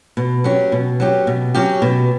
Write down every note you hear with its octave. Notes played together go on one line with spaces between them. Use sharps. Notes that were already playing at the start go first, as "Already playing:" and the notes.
B2
F#3 C#4 G4
B2
F#3 C#4 G4
B2
F#3 C#4 G4
B2